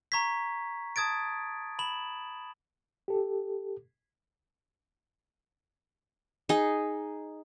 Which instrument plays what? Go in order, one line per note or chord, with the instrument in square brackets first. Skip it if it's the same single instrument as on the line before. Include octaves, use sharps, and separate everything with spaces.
[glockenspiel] A#5 C#6 G#6 B6
A5 D#6 G#6 A6 D7
B5 E7 F#7
[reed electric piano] G4 A4
[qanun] D#4 G#4